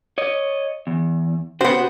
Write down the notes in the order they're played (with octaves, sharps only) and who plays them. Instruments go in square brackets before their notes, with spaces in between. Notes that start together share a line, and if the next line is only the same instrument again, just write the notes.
[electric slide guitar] C#5 D#5
E2
[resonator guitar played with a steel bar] B3 C5 [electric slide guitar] C#4 F#4 G4